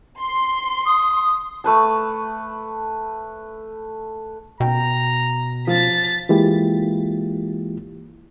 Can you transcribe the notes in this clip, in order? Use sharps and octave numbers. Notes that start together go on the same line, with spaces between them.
C6
D#6
A3 B4 A5
B2 G5 A#5
F3 A6 B6
E3 G#3 A#3 E4 F4 G4